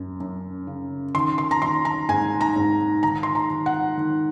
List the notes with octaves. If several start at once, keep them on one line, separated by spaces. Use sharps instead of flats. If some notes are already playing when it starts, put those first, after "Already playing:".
Already playing: F#2
F#2
C#3
D#3 C6
C6
A#5
D#3 C6
A#5
G#2 G#5
A#5
G#2
D#3 A#5
C6
A#5
D#3
F#5
D#3